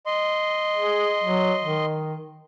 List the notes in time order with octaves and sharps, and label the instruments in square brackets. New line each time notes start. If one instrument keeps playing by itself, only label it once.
[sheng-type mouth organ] D#5 C6
[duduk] G#4
F#3
D#3